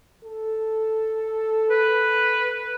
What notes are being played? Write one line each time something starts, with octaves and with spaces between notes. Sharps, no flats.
A4
B4